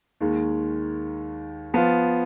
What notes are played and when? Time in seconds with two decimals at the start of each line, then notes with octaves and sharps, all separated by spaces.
0.20 D#2 D#3 G#3
1.74 F3 B3 F4